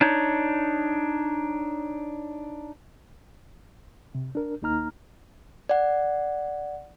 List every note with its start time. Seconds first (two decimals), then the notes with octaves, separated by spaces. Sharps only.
0.01 D4 D#4 C#5
4.15 C3
4.35 D4 A#4
4.62 D#2 A#3 D#4 A#5 F6
5.69 D5 F#5